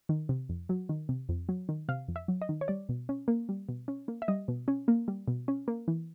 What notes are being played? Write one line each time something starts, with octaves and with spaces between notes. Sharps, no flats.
D#3
C3
F2
F#3
D#3
C3
F2
F#3
D#3
C3 F5
F2
E5
F#3
D#5
D#3
C#5
G3 D5
B2
C#4
A#3
G3
B2
C#4
A#3
E5
G3 D#5
B2
C#4
A#3
G3
B2
C#4
A#3
E3